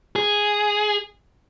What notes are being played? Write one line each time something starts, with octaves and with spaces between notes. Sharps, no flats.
G#4